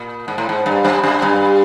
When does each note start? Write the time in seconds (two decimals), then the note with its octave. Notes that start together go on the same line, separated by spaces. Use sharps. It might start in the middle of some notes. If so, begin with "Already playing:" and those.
Already playing: A#2
0.28 G#2
0.38 A2
0.49 G#2
0.66 G2
0.85 F#2
1.03 F#2
1.22 G2